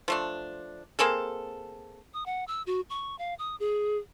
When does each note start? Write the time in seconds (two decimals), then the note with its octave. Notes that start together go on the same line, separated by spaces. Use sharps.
0.08 F3 A3 D4
0.99 A#3 C4 G#4 A4
2.14 D#6
2.26 F#5
2.48 E6
2.67 F#4
2.90 C#6
3.19 F5
3.39 D#6
3.60 G#4